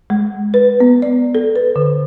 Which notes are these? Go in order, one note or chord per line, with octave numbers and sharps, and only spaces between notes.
G#3
B4
B3
D5
A4
B4
D3